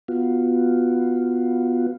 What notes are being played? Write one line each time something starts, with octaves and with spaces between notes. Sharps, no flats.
B3 F4 F#4